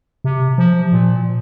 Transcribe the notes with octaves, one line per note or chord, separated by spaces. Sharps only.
C3
F3
A#2